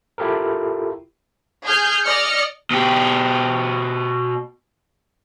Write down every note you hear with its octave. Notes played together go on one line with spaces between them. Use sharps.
E4 F4 G4 A4 A#4
G#4 F6 G6
D5 D#5 F6 C#7
B2 G4